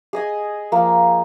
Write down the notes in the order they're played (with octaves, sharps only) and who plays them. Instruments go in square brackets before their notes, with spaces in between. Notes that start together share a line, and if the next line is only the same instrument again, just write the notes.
[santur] G#4 D#5 G#5
F3 A#3